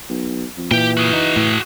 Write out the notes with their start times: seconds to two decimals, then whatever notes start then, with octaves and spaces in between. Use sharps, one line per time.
0.09 B1
0.57 F2
0.71 A#2 E3 G4 G5
0.97 F#4 G#4
1.13 D#4
1.37 A2